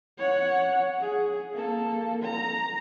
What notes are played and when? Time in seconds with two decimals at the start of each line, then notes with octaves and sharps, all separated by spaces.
0.18 C#5 F#5
1.00 G#4
1.53 A#3 A4
2.23 A#5